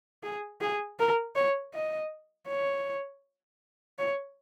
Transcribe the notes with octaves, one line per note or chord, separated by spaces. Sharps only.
G#4
G#4
A#4
C#5
D#5
C#5
C#5